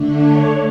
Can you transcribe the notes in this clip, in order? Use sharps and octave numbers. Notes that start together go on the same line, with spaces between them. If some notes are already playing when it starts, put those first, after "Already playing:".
Already playing: D3 A3 D4
C#5